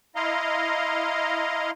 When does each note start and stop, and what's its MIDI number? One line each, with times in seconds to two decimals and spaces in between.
0.16 1.71 64
0.16 1.71 75
0.16 1.71 77
0.16 1.71 82
0.16 1.71 84